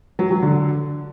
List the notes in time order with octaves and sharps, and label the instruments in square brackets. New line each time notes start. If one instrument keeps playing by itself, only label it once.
[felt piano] F#3
F#3
D3